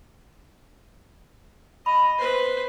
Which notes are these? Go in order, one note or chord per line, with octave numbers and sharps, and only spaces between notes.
D#5 B5
B4 C5